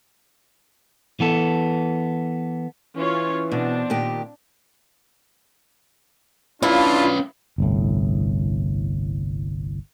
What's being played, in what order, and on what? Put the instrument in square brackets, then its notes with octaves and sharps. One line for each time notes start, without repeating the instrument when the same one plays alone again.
[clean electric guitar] E3 B3 A4
[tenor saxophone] E3 [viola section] C#4 F4 C#5
[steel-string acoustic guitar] B2 [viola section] C4 D4
[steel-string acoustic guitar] A#2 D#3 G4
[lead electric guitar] C#4 B4 [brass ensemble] D4 F4 [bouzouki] E4
[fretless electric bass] G1 C2 A2